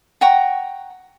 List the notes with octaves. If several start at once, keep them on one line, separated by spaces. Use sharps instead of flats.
F#5 G5 A#5 C#6